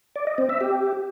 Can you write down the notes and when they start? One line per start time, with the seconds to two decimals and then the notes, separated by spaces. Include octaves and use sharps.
0.16 D5
0.27 D#5
0.38 C4
0.49 E5
0.61 G4